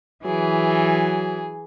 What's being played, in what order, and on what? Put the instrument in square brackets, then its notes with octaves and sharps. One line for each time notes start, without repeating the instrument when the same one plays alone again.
[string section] E3 [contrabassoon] F#3 [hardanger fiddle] G#4